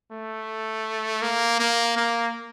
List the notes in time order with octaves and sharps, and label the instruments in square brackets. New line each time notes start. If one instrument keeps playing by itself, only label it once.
[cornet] A3
A#3
A#3
A#3